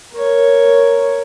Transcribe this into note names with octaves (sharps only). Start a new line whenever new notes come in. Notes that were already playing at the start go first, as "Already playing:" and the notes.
A#4 C#5